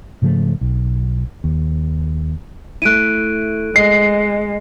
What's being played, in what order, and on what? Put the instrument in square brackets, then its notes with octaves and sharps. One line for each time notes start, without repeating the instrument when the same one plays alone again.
[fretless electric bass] G#2 C#3 F3 A3
B1
D#2
[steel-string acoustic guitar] A3 E4 [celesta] F#6 D7 D#7
[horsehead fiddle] G#3 [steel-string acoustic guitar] D#5 [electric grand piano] C7